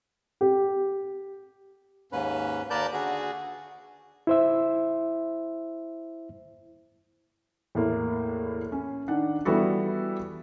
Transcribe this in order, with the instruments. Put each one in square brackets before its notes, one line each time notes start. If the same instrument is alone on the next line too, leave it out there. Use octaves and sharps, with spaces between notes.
[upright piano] G4
[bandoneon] D#2 G#2 C#4 B4
D#2 A#4 B4 D5 A5 G6
D3 F#4 G#4
[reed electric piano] E4 C5 E5
[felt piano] E2 A2 A#3
C#4
D#3 D4 F#5
E3 G3 B3 E4 F#4 A4